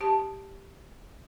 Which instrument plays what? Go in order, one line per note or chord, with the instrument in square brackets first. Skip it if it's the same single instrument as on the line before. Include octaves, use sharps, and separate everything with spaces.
[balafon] G4 A5